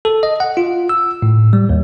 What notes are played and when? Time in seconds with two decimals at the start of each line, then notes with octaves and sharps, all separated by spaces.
0.05 A4
0.23 D#5
0.40 F#5
0.57 F4
0.89 E6
1.22 A2
1.53 G3
1.69 D#2